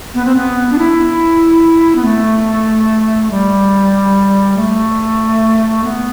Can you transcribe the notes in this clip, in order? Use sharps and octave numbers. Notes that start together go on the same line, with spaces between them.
B3
C4
B3
D4
E4
B3
A3
G3
A3
B3